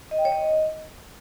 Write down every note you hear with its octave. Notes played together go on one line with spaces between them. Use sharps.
D#5
G5
C#5
D#5